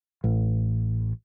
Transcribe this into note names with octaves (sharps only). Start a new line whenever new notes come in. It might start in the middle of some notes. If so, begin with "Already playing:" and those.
A1